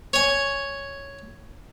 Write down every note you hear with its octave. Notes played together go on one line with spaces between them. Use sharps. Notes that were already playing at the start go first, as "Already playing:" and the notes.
C#5 G#5